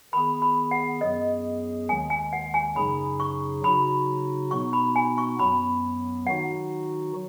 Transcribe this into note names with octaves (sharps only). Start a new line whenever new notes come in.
D#3 B3 G#4 B5
B5
F#5
F#2 F#3 B3 G#4 D#5
D#2 D#3 G#3 G#5
G#5
F#5
G#5
F#2 C#3 F#3 D#4 G#4 B5
C#6
C#3 F#3 D#4 F#4 B5
B2 B3 D#4 C#6
B5
G#5
C#6
F#2 F#3 B3 B5
D#3 F#3 D#4 F#4 F#5